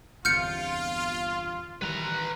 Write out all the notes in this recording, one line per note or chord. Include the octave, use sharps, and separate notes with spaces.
G1 E2 C3 F4 F6 G6 C#7
D#3 E3 G3 B4 A#5